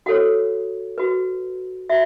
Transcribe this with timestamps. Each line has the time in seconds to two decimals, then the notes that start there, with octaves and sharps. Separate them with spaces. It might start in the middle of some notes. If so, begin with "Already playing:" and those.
0.06 F#4 A4 C#5 F#5
0.98 F#4 B4
1.89 F#4 E5